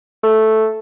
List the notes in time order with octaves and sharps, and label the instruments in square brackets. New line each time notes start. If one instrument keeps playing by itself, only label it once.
[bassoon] A3